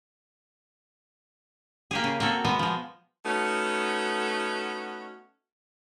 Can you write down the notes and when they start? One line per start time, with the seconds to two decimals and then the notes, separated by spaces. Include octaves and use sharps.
1.91 A#3 G4 G#4
2.04 C#3
2.20 A#3 C4 F#4 A4
2.45 B2 G#3 B3
2.59 F3 G#3
3.25 A3 B3 C#4 D#4 F#4